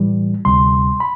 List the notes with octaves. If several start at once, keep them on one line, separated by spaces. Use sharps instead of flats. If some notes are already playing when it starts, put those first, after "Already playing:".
Already playing: A2 E3 G3
D2 C3 G3 C6
B5